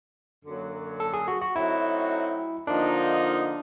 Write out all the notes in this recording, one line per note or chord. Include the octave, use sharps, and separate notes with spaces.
F#2 D3 F#3 A#3
A4
G#4
F#4
F#4
F#3 A3 C4 D#4 E4 F#4
D3 F3 A#3 D4 D#4